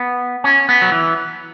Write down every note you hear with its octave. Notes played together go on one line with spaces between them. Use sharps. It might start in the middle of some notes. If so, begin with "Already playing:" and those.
Already playing: B3
C#4
B3
F#3
E3